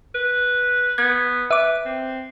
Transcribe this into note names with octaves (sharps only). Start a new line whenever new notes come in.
B4
B3 G#6
B4 E5 D6
C4